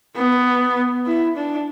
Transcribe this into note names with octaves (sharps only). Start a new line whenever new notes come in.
B3
E4
D4